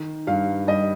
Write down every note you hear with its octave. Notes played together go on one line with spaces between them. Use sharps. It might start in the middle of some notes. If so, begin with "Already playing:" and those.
Already playing: D#3
G2 F5
G3 D#5